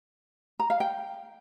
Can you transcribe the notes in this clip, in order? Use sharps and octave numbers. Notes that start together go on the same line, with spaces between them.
A#5
F5
G5